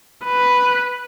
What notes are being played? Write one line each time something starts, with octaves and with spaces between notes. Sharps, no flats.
B4